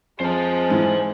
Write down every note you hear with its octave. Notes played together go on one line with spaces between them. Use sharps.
F2 G#3 C5 A5
G#2 E3